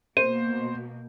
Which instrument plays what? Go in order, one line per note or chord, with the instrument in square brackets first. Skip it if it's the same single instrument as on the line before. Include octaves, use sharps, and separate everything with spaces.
[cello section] B2 A#3 [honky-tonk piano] C5 [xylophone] D#7